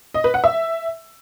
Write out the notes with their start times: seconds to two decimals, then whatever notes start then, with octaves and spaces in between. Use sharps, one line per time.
0.14 D#5
0.24 B4
0.34 F#5
0.44 E5